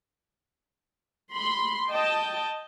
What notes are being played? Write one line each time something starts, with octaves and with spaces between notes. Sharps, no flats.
B5 C6
D#5 G5 A5